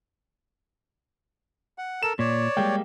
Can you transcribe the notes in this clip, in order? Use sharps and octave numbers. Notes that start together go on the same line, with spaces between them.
F#5
A4 A#4 E7
A#2 C#5 D5
G3 G#3 A#3 G5